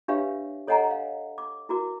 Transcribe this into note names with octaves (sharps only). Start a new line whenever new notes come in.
D4 G4 B4 C#5 E5 F5
A4 C#5 D#5 F#5 G#5 A#5
F5
D6
E4 F#4 A#4 D6